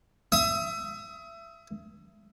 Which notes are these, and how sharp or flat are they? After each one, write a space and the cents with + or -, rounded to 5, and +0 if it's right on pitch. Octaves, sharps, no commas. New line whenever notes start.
E5 +25 D#6 +40